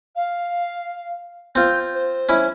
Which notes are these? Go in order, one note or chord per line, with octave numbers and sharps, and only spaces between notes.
F5
C4 F4 G6
C5
C#4 E4